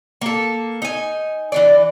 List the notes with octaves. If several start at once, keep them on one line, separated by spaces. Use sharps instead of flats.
A#3 A4
D#4 G#5
E3 D4 D5